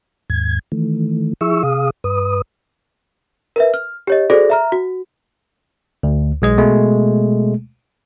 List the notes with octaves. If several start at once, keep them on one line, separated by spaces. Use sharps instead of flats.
D#2 G#2 G#6
D#3 E3 A3
F3 E4 G#4 E5 C#6 E6
C3 G#4 F5 D#6
G2 B4 D#6
A#4 B4 E5
F6
G4 C#5 D#5
F#4 G#4 A4 C5 D5 A#6
E5 A#5 F6
F#4
D2
B1 G#3 D#5
B2 G#3 A3